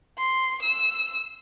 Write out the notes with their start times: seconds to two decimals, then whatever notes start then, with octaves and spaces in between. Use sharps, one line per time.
0.18 C6
0.62 E6